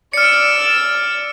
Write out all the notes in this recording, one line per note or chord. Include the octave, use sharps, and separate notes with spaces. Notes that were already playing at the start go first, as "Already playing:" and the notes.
D5 E6 F6 C#7